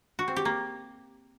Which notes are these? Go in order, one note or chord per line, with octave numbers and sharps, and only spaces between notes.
F#4
C4
G4
A#3